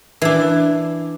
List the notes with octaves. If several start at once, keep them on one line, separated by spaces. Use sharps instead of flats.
E3 D4